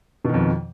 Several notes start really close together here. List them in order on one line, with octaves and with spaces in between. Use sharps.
B2 D#3 F2